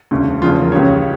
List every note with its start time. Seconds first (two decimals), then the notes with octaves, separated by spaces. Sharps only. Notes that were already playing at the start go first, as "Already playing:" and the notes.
0.11 E1 D2 C#3
0.42 F1 E2 C#3 F3 F4
0.52 A4
0.62 A#4
0.72 C#2 C#3 G3 C#5